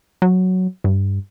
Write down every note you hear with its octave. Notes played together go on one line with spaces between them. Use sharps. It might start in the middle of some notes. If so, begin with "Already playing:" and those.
F#3
G2